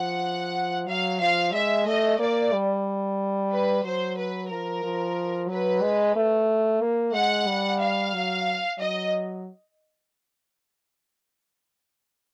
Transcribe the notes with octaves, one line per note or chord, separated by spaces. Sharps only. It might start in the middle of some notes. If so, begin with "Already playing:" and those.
Already playing: F3 F#5
F#3 F5
F3 F5
G#3 E5
A3 D#5
A#3 D5
G3
B4
F#3 C5
B4
F3 A#4
F3
F#3 B4
G#3
A3
A#3
G#3 F#5
G3
F5
F#3
F#3 D#5